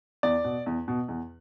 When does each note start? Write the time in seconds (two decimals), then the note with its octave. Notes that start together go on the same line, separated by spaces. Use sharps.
0.23 E2 D5
0.44 B2
0.66 E2
0.88 B2
1.08 E2